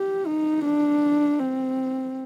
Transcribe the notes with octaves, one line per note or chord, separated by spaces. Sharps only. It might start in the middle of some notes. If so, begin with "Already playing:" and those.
Already playing: G4
D#4
D4
C4